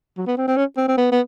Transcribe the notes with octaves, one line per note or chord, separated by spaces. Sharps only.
F#3
B3
C4
C4
C#4
C4
C4
B3
B3